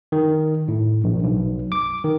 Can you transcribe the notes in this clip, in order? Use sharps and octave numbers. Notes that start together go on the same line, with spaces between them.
D#3
A2
A#1
B1
D6
D#3